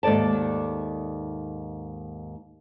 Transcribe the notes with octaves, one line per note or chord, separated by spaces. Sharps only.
D#2 G#2 A4 D5 A5